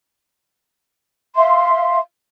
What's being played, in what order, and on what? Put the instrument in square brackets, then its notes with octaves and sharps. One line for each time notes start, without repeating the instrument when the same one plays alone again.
[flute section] E5 F5 C6